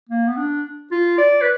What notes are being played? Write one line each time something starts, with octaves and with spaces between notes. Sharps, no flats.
A#3
B3
D4
F4
D5
B4